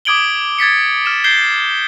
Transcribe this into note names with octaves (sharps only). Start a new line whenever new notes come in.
D6 D#6 G#6 D7 F#7 G7
G#6 A6 B6 C#7
F6 E7
G6 G#6 C7 G7